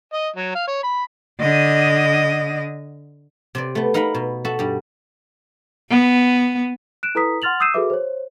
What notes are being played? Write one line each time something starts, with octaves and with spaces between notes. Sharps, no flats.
D#5
F#3
F5
C#5
B5
D3 D#5
C3 C4 D5
A3 B3
D#4 A#4 F5 F#5 B5
B2
F#4 A4 E5
G2 G3
B3
F#6 D7 E7
E4 A4 B4 A#5 D#6 B6
F#5 C6 F6 A6 F7 F#7
D#6 E6 G6 C7 D#7 E7
F#4 G#4 A4 B4 E5 D6
C5 C#5